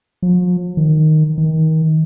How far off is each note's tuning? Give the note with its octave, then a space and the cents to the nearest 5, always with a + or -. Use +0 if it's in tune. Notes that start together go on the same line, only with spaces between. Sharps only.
F3 +45
D#3 -5
D#3 +25